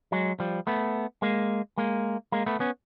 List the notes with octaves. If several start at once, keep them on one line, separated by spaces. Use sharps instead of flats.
F#3 G#3
F3 G3
A3 B3
G#3 A#3
G#3 A#3
G#3 A#3
A3 B3
B3 C#4